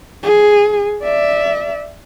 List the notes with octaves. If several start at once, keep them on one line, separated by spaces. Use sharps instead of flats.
G#4
D5 E5